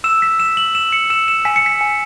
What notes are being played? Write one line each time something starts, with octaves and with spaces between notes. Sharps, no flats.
E6 E7
B6
E6 E7
F#7
E6 E7
C#7
E6 E7
E7
G#5 B6
C#7
B6
G#5